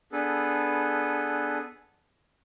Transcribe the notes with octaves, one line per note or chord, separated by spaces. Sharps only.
B3 D4 G#4 A4 B4